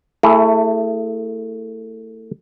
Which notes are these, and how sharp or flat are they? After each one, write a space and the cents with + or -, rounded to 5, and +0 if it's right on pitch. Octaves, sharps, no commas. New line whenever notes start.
A3 +25 E4 +0 G#4 +0